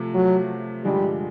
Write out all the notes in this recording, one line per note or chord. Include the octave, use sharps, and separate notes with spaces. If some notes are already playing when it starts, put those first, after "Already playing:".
Already playing: C3 F3 A3
F#3
G2 D3 F3 G3 G#3